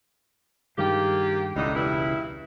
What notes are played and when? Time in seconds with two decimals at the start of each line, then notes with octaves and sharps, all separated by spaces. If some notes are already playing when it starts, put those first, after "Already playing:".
0.78 G2 D#3 G#3 A#3 F4 G4
1.56 E1 C#2 A2 D3 D#4
1.75 G2 E4